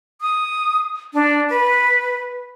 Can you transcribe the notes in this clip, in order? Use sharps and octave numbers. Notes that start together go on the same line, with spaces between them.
D#6
D4
B4